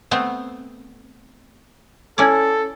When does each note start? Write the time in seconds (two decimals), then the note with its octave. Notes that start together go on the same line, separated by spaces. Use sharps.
0.11 A3 B3 C4
2.18 C#4 E4 A4 D5